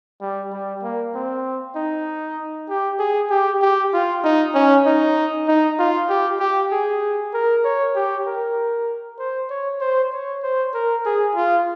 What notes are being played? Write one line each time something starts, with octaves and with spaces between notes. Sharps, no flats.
G3
G3
A#3
C4
D#4
G4
G#4
G4
G4
F4
D#4
C#4
D#4
D#4
F4
G4
G4
G#4
A#4
C#5
G4
A#4
C5
C#5
C5
C#5
C5
A#4
G#4
F4